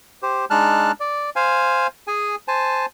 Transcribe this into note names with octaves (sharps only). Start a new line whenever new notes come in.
G4 C5
G#3 D4 D#4 A5 F6 F#6
D5
C5 F5 G#5
G#4 G#5
C5 G#5 A5